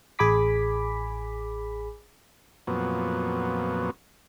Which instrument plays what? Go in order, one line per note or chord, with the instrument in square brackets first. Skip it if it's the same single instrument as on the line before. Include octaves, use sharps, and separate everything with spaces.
[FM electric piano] A1 G#4 G#5 B5 D6 B6
[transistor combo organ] F2 A#2 F#3 B3